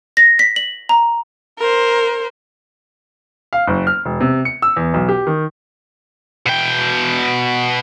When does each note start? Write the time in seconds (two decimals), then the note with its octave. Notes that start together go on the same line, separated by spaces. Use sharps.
0.17 A#6
0.39 B6
0.56 F#7
0.89 A#5
1.59 A#4 C5
3.53 F5
3.67 F#1
3.87 F6
4.05 E1
4.20 C3
4.45 C#7
4.62 E6
4.76 E2
4.94 B1
5.09 G4
5.27 D#3
6.46 B2 G5